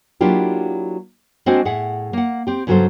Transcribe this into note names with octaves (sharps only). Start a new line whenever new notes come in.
F#3 A#3 D4 E4 F4 G4
G#3 C4 D4 F#4 C5 G#5
A2 G#4 E5 F#5
A#3 F#5
C4 G4
G2 C#3 F#3 G#4 A4 C5